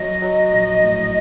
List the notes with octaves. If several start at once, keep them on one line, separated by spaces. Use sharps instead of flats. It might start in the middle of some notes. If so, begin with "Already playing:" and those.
Already playing: F#3 D#5
F#3
A#1
A2